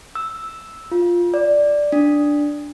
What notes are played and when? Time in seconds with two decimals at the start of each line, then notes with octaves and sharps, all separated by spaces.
0.15 E6
0.91 F4
1.34 D5
1.92 D4